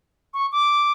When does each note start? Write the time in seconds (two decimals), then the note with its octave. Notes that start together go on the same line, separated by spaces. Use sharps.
0.34 C#6
0.52 D6